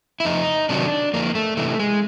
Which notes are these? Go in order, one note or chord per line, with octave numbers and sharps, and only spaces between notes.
E4
F2 D#4
C3 D#3 F#3 D4
F2 A#3
A3
C3 E3 A3
G#3